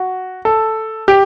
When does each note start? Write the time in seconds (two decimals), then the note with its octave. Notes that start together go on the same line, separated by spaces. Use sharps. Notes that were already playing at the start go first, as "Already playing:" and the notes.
Already playing: F#4
0.45 A4
1.08 G4